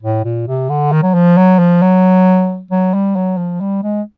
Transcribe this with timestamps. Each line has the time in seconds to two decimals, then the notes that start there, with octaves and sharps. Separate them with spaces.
0.03 A2
0.25 A#2
0.48 C3
0.70 D3
0.92 D#3
1.03 F#3
1.14 F3
1.37 F#3
1.59 F3
1.82 F#3
2.71 F#3
2.94 G3
3.16 F#3
3.38 F3
3.61 G3
3.83 G#3